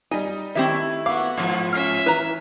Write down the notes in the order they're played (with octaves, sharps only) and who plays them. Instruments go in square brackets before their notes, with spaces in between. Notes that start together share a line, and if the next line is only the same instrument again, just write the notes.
[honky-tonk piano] G3 D#4 [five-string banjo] G#5
[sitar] D#3 A3 E4 [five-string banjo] C4 G4 E5
[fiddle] B3 F#4 [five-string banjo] F5 [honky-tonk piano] D6
[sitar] G#2 F3
[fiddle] C#4 E5 [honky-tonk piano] F6 C7
[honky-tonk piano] E3 [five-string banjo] B4 A#5